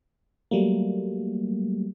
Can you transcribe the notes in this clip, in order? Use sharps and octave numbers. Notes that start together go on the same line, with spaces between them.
F#3 G3 A3 A#3